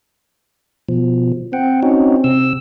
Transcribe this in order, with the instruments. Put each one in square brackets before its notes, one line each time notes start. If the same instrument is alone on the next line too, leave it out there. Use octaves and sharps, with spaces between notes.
[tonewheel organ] B2 F3
[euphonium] C4 [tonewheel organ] F#5 G5
[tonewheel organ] C#4 D#4 F#4
C3 E6